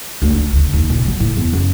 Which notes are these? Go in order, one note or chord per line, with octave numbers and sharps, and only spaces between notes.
D2
D4
D2
D#2
A#2
F#3
A2
E2
F#2